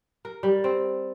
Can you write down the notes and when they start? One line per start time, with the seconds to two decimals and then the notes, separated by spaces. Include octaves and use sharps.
0.25 A#4
0.43 G3
0.64 C4